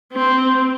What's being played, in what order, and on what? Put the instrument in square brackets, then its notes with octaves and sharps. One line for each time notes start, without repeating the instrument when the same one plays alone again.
[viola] C4